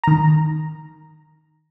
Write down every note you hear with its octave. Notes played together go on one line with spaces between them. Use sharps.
D#3 A#5